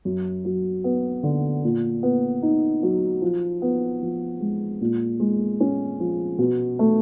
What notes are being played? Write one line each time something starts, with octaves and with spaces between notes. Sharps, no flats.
F#2
F#3
B3
D3
A#2
B3
D#4
F#3
F3
B3
F3
G#3
A#2
G#3
C#4
F3
B2
A3